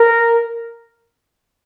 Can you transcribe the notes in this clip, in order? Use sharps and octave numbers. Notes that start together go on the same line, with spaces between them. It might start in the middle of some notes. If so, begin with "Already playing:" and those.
Already playing: A#4